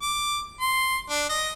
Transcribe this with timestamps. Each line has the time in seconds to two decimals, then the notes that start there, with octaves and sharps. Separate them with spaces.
0.02 D6
0.61 C6
1.10 D4
1.29 D#5